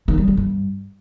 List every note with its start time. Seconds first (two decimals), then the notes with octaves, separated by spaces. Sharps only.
0.08 D#3
0.18 G3
0.28 D3
0.37 G2